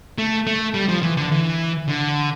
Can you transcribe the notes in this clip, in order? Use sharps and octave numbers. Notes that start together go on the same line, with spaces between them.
A3
A3
G3
F3
E3
D3
E3
D3